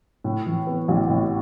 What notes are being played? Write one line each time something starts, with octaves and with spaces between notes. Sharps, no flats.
A2
E3
B3
A1
A2